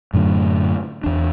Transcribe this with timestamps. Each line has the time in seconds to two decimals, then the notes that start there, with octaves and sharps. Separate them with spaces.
0.14 F#2 A2 D3
1.04 E2 D4